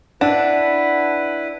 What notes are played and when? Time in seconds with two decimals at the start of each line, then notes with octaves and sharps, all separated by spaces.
0.21 D4 E4 B4 F#5 A5